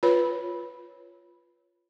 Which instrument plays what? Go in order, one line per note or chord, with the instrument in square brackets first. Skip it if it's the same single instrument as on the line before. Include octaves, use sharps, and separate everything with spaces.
[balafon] F4 B4 C#5 B5